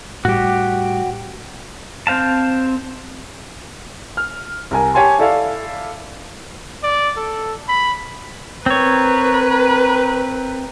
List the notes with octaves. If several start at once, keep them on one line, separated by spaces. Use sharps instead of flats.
A2 G3 F#4 G4
C4 C5 F5 A5
F6
C2 A#4 G#5
G4 C#5 G#5 A5 C6
E4 A4 D5 E5 F5
D5
A4
B5
C4 A#4 B4 C#5